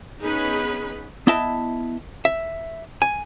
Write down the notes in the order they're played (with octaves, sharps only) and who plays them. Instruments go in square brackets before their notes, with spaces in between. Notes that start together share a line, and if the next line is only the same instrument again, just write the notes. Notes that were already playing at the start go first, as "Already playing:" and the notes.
[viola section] B3 C#4 D#4 G#4 B4 B5
[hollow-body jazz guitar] B3 E4 D#5 E5 A5
E5
G#5